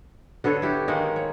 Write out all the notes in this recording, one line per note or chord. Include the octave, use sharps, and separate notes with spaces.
D3 B3 A4 C#5
E4 G4
D#3 G#3 A#3 D#4
C#5